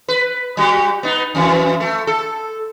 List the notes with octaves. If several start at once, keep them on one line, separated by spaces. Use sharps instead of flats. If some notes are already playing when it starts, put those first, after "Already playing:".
B4
G3 F#4 G4
B3 D#4
F2 E3
A3
A4